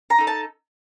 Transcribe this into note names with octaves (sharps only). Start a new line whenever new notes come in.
A#5
D#4 A4
A5